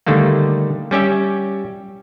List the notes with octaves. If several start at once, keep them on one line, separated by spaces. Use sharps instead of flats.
D3 D#3 G3 A3 A#3
G3 C#4 G4 E5